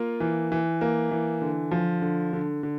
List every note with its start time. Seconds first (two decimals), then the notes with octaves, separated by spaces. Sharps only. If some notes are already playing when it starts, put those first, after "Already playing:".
Already playing: A#3 F4
0.20 E3
0.52 E3
0.81 A#3
1.11 E3
1.42 D3
1.71 F3
2.02 D3
2.33 D3
2.63 D3